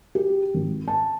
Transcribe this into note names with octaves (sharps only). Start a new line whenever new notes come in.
G4
G#1
A5